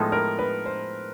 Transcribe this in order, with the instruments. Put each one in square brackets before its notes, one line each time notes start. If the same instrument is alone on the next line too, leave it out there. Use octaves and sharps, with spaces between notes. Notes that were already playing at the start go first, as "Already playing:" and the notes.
Already playing: [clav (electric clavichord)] A2 F3 G#3 B3 D#4 [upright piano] A4
[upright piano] A#4
B4
C5